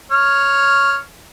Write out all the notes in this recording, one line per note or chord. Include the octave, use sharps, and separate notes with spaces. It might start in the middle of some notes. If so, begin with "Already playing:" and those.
C#5 F6